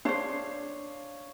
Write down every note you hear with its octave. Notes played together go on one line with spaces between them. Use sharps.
D4 C5 C#5 F5